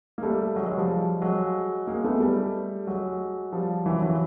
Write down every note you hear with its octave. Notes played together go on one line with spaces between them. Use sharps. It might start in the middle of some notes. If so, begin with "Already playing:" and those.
A#3
G3 A3
F#3 G#3
F#3 G#3
F3 G3
F#3 G#3
G#3 A#3
A3 B3
G3 A3
F#3 G#3
F3 G3
E3 F#3
E3 F#3